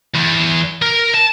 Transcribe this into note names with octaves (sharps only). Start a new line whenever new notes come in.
E2
A#4
A5